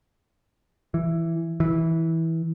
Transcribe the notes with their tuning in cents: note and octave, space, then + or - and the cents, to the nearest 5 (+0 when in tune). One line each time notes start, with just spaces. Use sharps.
E3 +10
E3 -15